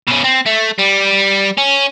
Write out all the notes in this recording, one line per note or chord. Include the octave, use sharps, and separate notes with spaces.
B2 C#4
C4
A3
G3
C#4